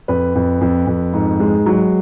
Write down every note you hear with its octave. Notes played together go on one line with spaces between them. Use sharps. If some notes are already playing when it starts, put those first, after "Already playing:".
F2 B4
F2
F2
F2
G#2
G#3
F#3